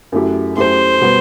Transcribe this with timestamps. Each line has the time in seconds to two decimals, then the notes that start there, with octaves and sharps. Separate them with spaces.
0.12 F#2 F#3 A3 E4 G4
0.56 F#2 F#3 A3 E4 G4 C5
1.01 B2 G3 B3